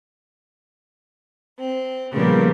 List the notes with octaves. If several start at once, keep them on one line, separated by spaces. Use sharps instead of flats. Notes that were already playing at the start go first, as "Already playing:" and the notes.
C4
A#2 C#3 F3 G3 A#3 B3